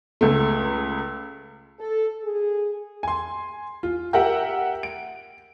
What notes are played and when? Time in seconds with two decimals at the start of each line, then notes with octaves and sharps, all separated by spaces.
0.21 C#2 A3
1.79 A4
2.24 G#4
3.03 G#5 C6
3.83 F4
4.13 G4 A#4 E5 F#5 G5
4.83 D7